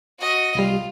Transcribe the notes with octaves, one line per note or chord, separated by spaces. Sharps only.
F#4 D#5
C2 G3 F4